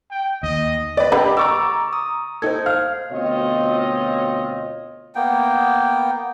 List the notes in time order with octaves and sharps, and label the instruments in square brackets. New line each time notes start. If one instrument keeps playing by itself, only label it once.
[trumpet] G5
[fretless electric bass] D#2 [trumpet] D#5
[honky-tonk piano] B4 D5 [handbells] D#5
[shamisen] D3 B4 [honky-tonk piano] G4
[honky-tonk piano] A#5 C#6 E6 [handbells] D6 A6
[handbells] D#6
[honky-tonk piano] D#4 A4 [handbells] C5 G#6
[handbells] F5 [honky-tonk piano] F6
[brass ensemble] D2 B2 C4 F4 C#5 D#5
[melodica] A#3 B3 G5